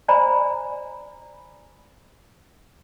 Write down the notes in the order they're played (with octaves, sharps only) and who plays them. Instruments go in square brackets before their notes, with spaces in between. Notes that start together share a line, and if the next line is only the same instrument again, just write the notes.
[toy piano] C5 D5 G#5 A#5 B5